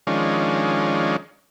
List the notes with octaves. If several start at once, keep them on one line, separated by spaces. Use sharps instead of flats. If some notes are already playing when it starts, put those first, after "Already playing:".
D#3 F3 G#3 C#4 D4